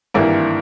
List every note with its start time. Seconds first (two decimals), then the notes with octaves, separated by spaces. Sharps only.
0.14 G#1 G2 E3 A#3 E4